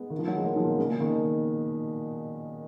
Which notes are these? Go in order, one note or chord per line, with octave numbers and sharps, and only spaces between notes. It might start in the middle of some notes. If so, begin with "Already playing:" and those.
Already playing: G#3 B3
D#3
F3
F#3
G#3
F#3 A#3
F3 G#3
B2 D#3
A#2 C#3
A#2 C#3
B2 D#3